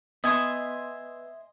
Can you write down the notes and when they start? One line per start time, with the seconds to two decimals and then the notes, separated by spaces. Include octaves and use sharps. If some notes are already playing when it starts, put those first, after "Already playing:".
0.24 B3 D#5 E5 G#5 C6 D#6